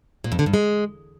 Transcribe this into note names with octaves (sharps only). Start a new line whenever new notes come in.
A#2
F2
D3
G2
G#3